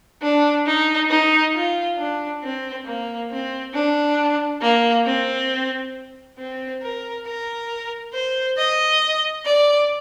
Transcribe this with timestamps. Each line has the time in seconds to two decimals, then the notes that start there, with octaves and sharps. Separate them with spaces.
0.22 D4
0.66 D#4
1.10 D#4
1.54 F4
1.98 D4
2.42 C4
2.86 A#3
3.31 C4
3.74 D4
4.62 A#3
5.06 C4
6.38 C4
6.82 A#4
7.26 A#4
8.14 C5
8.58 D#5
9.46 D5